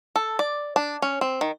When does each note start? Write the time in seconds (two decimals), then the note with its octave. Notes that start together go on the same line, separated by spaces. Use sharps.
0.16 A4
0.39 D5
0.76 D4
1.02 C#4
1.21 C4
1.41 D#3